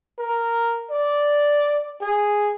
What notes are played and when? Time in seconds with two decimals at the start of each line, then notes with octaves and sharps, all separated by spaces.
0.19 A#4
0.91 D5
2.01 G#4